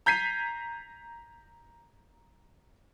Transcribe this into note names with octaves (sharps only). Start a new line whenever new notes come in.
A#5 G6 G#6 B6 C7 D#7